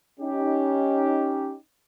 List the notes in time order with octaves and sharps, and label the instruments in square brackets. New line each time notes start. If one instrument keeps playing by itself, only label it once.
[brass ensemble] C#4 D#4 G4